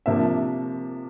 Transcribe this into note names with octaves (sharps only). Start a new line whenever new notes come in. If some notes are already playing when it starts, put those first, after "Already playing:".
C3 F3 A#3 D4 F4 E5